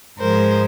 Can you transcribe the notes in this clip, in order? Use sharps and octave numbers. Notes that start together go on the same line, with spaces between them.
G#2 F3 G#3 A#4 C5